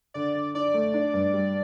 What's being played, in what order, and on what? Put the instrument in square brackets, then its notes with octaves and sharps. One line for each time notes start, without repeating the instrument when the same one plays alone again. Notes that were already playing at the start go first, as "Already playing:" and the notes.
[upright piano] D3 [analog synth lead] D5
[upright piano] D3
[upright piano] D4 [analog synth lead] D5
[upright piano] A3
D4
G2
G3